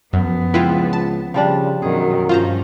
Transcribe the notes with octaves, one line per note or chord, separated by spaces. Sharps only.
F#2 F3 B3
C#2 C4 E4 F4 B4
A5
C#3 F3 G3 D4
F#2 B2 D#3 G#4
G2 C#4 F4 C5 A#5